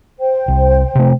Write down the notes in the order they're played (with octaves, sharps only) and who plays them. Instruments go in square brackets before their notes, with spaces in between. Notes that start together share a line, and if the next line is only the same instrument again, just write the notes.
[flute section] C5 G5
[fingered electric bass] C2
C3 A3